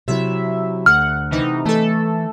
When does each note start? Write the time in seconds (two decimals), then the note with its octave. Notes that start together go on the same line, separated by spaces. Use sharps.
0.08 C3 F#3 E4 E5
0.86 D2 F#5 F6
1.31 C3 E3 D#4
1.65 E3 A3 A4 A5